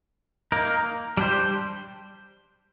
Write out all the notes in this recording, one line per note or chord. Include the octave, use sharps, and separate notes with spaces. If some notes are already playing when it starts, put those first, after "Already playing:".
A#3 D#4 A#4
G3 D4 G4 C5